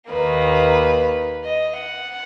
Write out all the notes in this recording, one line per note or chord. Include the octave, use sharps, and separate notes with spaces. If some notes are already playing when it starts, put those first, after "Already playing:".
D#2 D#3 A#3 B4
D#5
F#5